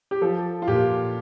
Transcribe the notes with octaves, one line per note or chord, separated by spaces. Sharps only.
G4
F3 A4
F4
A#2 G4